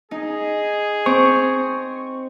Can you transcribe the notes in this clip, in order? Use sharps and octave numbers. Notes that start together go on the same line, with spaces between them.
D#4 G#4
C4 C5 C#6